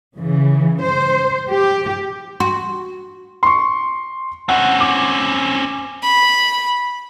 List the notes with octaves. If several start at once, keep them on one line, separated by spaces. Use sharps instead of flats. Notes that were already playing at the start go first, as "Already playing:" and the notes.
C#3 E3
C5
G4
F#4 C6
C6 C#6
C4 C#4 F#5
D6
B5